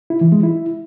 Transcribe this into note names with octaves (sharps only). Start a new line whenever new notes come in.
E4
E3
G#3
E4